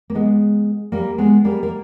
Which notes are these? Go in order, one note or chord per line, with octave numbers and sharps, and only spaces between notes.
A#3
G#3 B3
G3 A#3
G#3 B3
G3 A#3
A#3